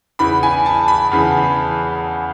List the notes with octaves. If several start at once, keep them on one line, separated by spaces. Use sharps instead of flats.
E2 C#3 E3 B5
G#5
A5
B5
E2 C#3 E3